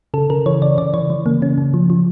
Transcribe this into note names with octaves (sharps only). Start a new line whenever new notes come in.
C#3 A4
C#3 A#4
E3 C#5
C#3 D5
C#3 D5
E3 C#5
E3
C#3 A#3
C#3 C#4
C#3
F3
F3